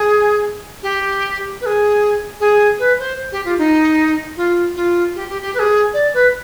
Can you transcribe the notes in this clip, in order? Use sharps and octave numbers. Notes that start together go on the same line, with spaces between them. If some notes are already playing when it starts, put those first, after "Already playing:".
Already playing: G#4
G4
B4
G#4
G#4
B4
C5
G4
F4
D#4
F4
F4
G4
G4
G4
B4
G#4
D5
B4